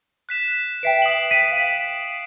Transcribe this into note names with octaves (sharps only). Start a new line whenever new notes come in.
F#6 B6 E7
B4 E5 G5 B6 C7 D7
D#6 F#7
B6 D#7
F5